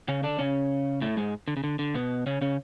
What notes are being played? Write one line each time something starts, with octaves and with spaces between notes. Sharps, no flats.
C#3 C#4
D3 D4
C#3 C#4
A2 A3
G#2 G#3
D3
C#3
D3
D3
B2 B3
C#3 C#4
C#3 C#4